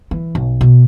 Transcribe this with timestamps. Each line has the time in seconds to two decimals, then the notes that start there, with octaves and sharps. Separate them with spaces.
0.11 E3
0.35 B1
0.61 B2